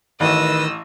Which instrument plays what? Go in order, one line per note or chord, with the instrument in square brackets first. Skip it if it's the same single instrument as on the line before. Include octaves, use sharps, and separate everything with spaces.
[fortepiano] A1 [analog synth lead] D#3 [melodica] B4 [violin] D#5 E6